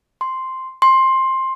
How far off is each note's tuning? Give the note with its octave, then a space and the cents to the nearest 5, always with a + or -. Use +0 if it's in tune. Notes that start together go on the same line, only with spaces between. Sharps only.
C6 +0
C6 +15